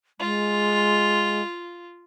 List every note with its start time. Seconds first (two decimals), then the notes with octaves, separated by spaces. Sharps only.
0.20 G#3 F4